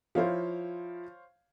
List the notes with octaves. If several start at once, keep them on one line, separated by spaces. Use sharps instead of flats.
F3 E4 C5 C#5 F5